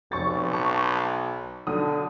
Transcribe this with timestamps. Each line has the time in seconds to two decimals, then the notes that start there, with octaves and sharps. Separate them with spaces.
0.12 F1 B1 C#6 A6
0.51 A5 C#6
1.67 B1 D3 D#6